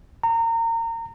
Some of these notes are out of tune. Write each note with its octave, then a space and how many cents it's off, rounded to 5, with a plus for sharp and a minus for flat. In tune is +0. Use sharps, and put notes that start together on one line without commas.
A#5 -30